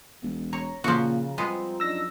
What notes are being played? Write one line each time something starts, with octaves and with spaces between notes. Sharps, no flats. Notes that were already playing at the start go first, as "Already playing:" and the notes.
E1
C#5 A#5
A#2 C#3 F3 F#4
F3 G3 G#3 B3 C4
F#2 D4 D#4 E6 A#6